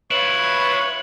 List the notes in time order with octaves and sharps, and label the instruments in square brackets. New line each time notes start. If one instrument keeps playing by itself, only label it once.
[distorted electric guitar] E4 F4 [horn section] B4 C#5 [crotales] F#7